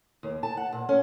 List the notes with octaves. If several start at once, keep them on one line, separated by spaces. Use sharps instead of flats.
D#2
A5
F#5
A#2
C#4